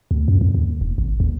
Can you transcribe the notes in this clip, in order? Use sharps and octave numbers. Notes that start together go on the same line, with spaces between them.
D2
F#2
F2
D#2
E1
G#1
D#2